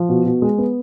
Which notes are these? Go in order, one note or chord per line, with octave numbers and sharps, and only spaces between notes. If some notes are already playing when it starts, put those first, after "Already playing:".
Already playing: F3
B2
B2
G#3
B3